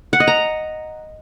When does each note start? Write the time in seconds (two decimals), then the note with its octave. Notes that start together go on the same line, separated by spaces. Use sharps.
0.13 F#5
0.20 D#5
0.28 A#5